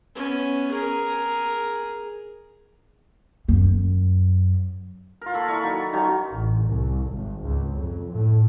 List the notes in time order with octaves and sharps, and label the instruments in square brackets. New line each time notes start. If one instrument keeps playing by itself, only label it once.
[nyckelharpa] B3 C#4
G#4 A#4
[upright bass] F#2
[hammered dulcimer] F4 A#4
A#3 A4 B5 C#6
E3 D5 C#6
D#3 F#3 A4
D#3 F3 F#3 C#4
[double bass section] A1
C2
G#1
C#2
F2
A2